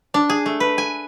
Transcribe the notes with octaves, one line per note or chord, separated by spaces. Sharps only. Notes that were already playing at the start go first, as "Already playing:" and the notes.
D4
G#4
A3
B4
G#5